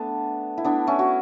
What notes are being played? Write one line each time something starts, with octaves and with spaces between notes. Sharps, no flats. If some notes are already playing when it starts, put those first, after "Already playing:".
Already playing: A3 B3 D4
E4
B3 D4
C#4 E4
F#4